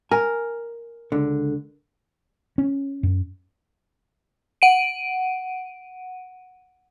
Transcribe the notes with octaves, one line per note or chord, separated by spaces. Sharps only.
A#4 G#5
C#2 D3
C#4
F#2
F#5 D7 D#7